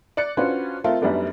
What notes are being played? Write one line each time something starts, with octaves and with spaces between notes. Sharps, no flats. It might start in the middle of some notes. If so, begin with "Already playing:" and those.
D5 D6 F#6 C#7
C#4 D4 F4 F#4 B4 C5
A3 C4 F4 A4 A#4
F#2 G3 A3 B3 D4 D#4